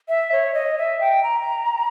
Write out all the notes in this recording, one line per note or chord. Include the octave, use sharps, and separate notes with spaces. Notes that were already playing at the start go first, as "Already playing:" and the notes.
E5
C#5
D#5
E5
G5
A#5